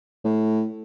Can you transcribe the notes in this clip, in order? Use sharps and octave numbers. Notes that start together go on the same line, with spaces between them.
A2